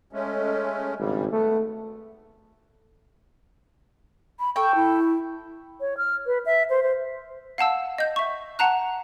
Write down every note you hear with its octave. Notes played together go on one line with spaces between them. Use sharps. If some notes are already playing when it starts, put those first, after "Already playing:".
G#3 A3 C#4
G#1 G2 C#3 G3
A3 B3
B5
A4 G5 C#6
E4
C#5
F6
B4
E5
C5
C5
F5 F#5 A5 E6
D#5 G6
E5 C#6
F#5 A5 A#5 F#6